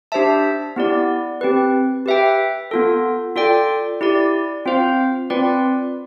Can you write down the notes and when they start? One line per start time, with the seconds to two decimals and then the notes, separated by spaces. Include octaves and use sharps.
0.12 D4 G4 C5 E5 A5
0.76 B3 E4 G4 D5
1.41 C4 G4 B4
2.06 G4 B4 E5 G5
2.71 B3 F4 A4
3.36 F4 A4 D5 G5
4.01 E4 G4 D5
4.65 C4 F4 C5 F5
5.30 C4 F4 B4 D5